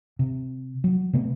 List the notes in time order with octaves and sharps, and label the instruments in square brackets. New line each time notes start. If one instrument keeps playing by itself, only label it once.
[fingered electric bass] C3
F#3
C3 A3 B3